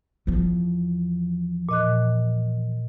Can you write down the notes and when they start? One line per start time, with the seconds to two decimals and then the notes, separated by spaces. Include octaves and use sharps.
0.27 E2 F3
1.69 A#2 D#5 F#6